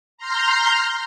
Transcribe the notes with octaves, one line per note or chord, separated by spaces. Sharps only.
A#5 C6 F6 G6